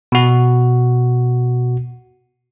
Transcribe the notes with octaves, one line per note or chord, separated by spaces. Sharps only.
B2 F#4